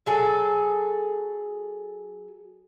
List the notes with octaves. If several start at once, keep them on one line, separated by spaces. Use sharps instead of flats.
F#3 G#4 A4